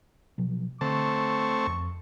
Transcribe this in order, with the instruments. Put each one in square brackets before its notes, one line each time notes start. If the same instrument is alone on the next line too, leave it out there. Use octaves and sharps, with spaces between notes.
[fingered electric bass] B2 F3 F#3
[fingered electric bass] D3 [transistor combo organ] A3 C4 A5 [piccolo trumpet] C#6
[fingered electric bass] F2